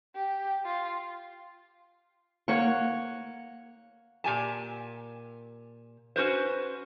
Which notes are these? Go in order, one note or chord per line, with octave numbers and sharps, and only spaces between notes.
G4
F4
A#3 C#5 F#5 C#6
A#2 G4 G#5 A5
C#4 F#4 B4 C5